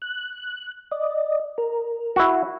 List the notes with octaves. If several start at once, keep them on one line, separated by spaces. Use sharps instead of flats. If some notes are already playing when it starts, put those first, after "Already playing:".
F#6
D5 D#5
A#4
E4 F#4